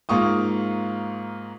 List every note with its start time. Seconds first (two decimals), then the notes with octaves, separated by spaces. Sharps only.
0.09 G#2 A#3 F4 C#6 D#6